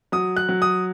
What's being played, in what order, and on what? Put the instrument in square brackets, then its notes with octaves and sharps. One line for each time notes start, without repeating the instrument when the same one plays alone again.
[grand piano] F#3 D#6
F#6
F#3
D#6